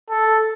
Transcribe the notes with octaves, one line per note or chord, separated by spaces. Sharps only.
A4